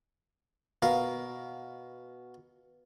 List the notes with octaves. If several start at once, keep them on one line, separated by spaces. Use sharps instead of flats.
B2 A#4 F5